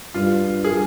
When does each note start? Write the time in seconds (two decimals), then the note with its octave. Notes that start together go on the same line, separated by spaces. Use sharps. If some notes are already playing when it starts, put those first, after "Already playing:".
0.14 G2 F4
0.65 G#4